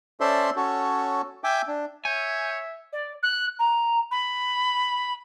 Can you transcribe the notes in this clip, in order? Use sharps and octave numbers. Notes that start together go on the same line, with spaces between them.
C#4 A4 C5 D5 E5 C6
C#4 F#4 A4 C#5
E5 G5 G#5 D6
D4
C#5 E5 G#5 G6
D5
F#6
A#5
B5